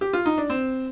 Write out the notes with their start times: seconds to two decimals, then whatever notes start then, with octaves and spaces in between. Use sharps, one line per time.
0.01 G4
0.13 F4
0.26 D#4
0.38 D4
0.50 C4